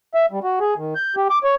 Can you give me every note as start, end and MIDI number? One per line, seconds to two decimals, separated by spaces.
0.14 0.26 76
0.31 0.40 55
0.44 0.59 66
0.61 0.74 68
0.76 0.94 51
0.96 1.15 91
1.16 1.28 67
1.30 1.39 86
1.44 1.55 73